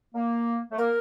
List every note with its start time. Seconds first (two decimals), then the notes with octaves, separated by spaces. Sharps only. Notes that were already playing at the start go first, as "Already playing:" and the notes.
0.15 A#3
0.71 A3
0.78 A#3 A#4